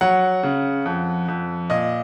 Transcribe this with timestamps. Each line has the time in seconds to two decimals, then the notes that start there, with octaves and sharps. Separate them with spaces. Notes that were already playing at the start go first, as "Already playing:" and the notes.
0.01 F#3 F#5
0.43 C#3
0.86 F2
1.28 F2
1.70 A#2 D#5